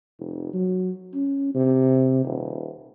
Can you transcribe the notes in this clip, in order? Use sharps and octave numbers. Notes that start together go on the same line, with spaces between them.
F1
F#3
C#4
C3
D#1